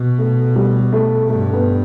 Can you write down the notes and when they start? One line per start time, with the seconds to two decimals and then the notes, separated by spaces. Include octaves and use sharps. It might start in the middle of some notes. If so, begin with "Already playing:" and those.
Already playing: B2
0.18 A3
0.56 G3
0.93 A3
1.29 G2 A3
1.53 B3